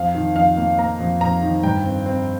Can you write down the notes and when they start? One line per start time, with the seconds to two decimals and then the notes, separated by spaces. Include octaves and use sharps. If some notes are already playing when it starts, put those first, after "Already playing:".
Already playing: F2 F5
0.15 D#3
0.36 F2 F5
0.57 A#3
0.78 A#3 A#5
1.00 F2
1.21 F2 A#5
1.42 D#3
1.63 G2 G5
1.84 C4
2.06 C4